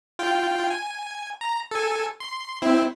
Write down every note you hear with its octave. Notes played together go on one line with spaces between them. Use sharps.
F4 G5
G#5
A#5
A4 G#5
C6
C4 E4